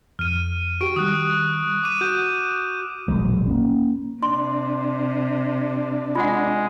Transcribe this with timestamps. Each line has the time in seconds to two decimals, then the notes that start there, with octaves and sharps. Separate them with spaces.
0.19 F2 F6 D#7
0.81 F#4 G4 C#6 D7
0.96 D#3 G3 D#6 F#6
1.84 D6 D#7
2.01 F#4 G6 E7
3.08 E1 A#1 F#3 G#3
3.47 A#3 C#4
4.22 C3 D4 C6
6.15 G#3 F4 F#5